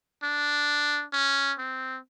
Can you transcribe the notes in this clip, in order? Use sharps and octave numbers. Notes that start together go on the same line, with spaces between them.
D4
C#4
C4